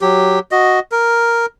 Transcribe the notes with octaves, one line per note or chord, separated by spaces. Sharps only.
F#3 G4
F#4 D#5
A#4